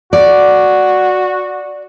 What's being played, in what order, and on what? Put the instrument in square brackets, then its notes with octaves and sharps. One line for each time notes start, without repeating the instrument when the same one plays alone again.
[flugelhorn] F#4 [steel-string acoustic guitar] D5